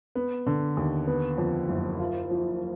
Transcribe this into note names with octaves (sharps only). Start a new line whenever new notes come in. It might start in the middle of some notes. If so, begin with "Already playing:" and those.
B3
D3
D#2
B3
F2
F#1
F4
F3